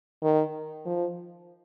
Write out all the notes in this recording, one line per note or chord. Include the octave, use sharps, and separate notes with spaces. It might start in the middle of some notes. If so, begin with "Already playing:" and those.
D#3
F3